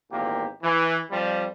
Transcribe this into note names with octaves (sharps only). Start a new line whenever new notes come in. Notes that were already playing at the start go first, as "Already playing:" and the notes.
G#1 E2 A#2 A#3 G4
E3
F2 F3 G3